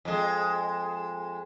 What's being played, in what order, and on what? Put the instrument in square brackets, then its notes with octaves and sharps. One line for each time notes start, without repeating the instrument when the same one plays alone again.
[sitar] F2 G#3